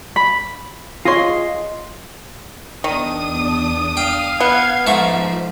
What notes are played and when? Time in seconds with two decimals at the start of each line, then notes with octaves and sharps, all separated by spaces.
0.16 B5 B6
1.05 F4 G#4 C#5 D#5 C6
2.84 E2 D#3 D4 D#6
3.97 F5 G5
4.40 B3 G#6
4.87 G#2 F3 A3 C#6